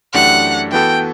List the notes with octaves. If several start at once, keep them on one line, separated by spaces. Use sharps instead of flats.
F#2 E3 A3 D4 G4 F#5
E3 B3 F#4 A4 G5